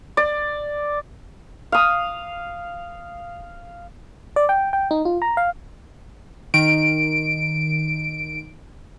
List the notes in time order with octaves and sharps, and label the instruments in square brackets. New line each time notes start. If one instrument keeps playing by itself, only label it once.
[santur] D5
F5 D#6
[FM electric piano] D5
G5
G5
D#4
F4
A#5
F5
[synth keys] D#3 D7